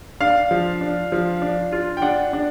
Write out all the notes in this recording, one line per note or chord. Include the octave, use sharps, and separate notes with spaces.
D4 F5
F3
D4
F3
D4
F4
G5
D4 F#5
D4